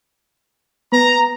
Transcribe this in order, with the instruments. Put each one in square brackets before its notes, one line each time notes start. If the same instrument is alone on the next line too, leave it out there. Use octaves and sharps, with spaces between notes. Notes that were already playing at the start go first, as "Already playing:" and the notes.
[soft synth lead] B3 [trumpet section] A#5